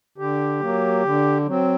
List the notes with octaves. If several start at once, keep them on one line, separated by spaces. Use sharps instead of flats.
D3 G4
F#3 A#3
D3
F#3 C4